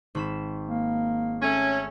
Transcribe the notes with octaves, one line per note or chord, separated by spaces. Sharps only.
G#1 B5 E7
A#3
A3 C#4